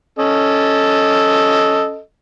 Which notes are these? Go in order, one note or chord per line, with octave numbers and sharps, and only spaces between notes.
C#4 A4 D#5